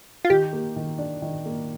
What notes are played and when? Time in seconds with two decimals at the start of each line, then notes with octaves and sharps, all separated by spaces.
0.25 F4
0.30 D#3 G4
0.53 A#3
0.76 D#3
0.98 D4
1.22 D#3
1.46 A#3